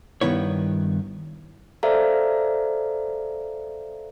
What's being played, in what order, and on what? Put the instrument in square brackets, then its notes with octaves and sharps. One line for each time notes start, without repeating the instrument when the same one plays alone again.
[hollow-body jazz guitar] G2 D#3 B3 E4 C#5
[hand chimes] A4 C5 D5 E5 F5 A#5